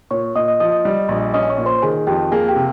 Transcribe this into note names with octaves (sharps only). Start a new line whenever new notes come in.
A#2 C#5 C#6
A#2 D#5 D#6
D#5 D#6
F3 D#5 D#6
D#5 D#6
G3
A#1
C#4 D#5 D#6
C#5 C#6
A#2
C5 C6
D#3 G#4 G#5
F2 G4 G5
A#3 G#4 G#5
G4 G5
C3